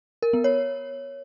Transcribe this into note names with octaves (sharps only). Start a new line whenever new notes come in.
A#4
B3
C#5